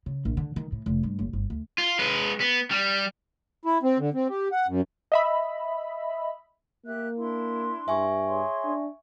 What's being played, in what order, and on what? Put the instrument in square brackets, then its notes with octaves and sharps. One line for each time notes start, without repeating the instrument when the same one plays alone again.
[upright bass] C#3
A#1
D3
D#3
A2
F1
G2
F#1
G1
D2
[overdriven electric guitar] F4
G#3 B4
B3
G3
[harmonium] E4
C4
D3
C4
G4
F#5
F#2
[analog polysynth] D#5 E5 B5
[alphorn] A#3 [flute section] G4 E5 F#6
[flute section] D4 E4 C6
[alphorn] G2 [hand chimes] E5 G#5 C#6
[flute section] G#4 C#5 C6
[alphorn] D4